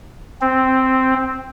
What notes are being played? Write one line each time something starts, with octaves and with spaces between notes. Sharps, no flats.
C4